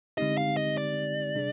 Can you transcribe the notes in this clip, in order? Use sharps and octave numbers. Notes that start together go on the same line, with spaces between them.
D3 G#3 C4 D#4 G4 D#5
F5
D#5
D5
C3 G3 D4 G#4